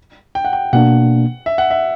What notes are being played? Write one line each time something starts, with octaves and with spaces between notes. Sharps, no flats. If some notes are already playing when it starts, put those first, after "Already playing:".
G5
F#5
G5
B2 A#3 D4 F#5
E5
F#5
E5